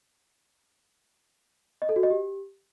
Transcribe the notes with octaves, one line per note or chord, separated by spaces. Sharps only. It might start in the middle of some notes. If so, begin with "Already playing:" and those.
D#5
A4
F#4
D#5
G4